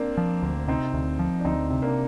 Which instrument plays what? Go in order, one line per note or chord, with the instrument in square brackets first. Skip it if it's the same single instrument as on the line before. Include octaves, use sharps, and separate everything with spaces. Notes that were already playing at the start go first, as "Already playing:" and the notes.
Already playing: [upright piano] A#3 C4 D4
[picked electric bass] F3
D2
[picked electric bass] C3 [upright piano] C4 D#4
[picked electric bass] D2
F3
[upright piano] D4
[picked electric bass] D2 [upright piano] C4 D#4
[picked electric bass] C3
[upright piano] A#3 D4